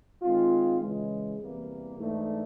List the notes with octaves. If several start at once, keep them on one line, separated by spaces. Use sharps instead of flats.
D#3 G#3 C4 F4
C#3 E3 G#3
E2 C3 E3 G3 A#3
G#2 E3 A3 D4